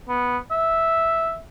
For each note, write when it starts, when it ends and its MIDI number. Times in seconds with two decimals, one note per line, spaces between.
0.09 0.37 59
0.51 1.36 76